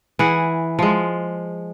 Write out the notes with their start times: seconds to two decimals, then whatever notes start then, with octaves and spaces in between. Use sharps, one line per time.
0.19 E3 G#4 F#5
0.79 F3 G#3